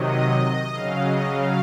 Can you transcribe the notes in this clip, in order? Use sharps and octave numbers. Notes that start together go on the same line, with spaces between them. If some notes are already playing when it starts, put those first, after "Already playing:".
Already playing: C3 D#3 F#3 D#5
C#3 F#3 F5
D#5
F5